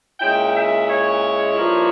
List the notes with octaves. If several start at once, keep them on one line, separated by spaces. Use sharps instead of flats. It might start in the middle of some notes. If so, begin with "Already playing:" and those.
A#2 G#3 C#4 E4 G5
E5
C#5
G2 F3 A#3 E4